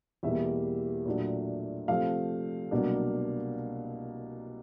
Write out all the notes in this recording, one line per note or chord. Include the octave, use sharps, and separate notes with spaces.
E2 B2 G3 A#3 E5
A#2 F#3 A3 D4
C3 F3 A3 F5
C2 B2 F#3 A#3 D4